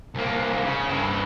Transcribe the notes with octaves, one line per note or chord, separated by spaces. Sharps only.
C2 A#3
C#3
G2 E4